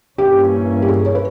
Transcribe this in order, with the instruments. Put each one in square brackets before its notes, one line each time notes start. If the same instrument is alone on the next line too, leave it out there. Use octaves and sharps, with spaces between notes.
[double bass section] G2 E3 A#3 C#4 [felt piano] G4
[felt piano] G4
G#4
C#5
B4